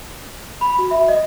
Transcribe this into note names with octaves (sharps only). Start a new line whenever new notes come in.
B5
F#4
E5
D#5